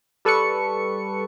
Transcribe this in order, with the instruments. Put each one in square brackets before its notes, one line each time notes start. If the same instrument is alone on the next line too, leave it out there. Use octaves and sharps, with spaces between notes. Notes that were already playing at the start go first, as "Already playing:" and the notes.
[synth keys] G3 A4 B4 C#6 C#7